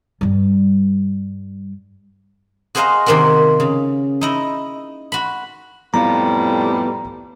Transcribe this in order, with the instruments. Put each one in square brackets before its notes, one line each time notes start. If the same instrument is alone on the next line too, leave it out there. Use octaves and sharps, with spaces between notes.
[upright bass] G2 G3
[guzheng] F#4 G#4 C5 D#5 F5 A#5
C3 D#3 A#3 C4 F#4
C#3
D#4 E4 D#5
F#4 B5
[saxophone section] F2 A2 G3 [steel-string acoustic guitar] B3 F4 [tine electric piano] A#5